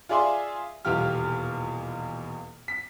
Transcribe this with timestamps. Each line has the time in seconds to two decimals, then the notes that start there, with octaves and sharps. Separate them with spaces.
0.09 F4 G#4 D5 E5 G#5 C6
0.85 D#1 E2 B2 F4 G4 F6
2.68 B6